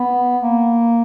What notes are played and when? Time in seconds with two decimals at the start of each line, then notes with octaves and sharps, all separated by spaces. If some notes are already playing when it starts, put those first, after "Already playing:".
Already playing: B3
0.42 A#3